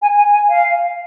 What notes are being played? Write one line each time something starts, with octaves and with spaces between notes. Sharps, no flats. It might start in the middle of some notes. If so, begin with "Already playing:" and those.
G#5
G#5
G#5
F5